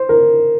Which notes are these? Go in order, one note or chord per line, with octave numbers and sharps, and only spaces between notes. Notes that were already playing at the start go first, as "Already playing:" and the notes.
Already playing: C5
A#4